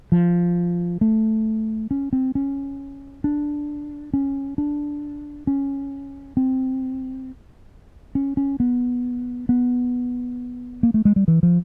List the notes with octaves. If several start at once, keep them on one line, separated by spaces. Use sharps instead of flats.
F3
A3
C#4
C4
C#4
D4
C#4
D4
C#4
C4
C#4
C#4
B3
B3
A#3
A3
G#3
G3
E3
F3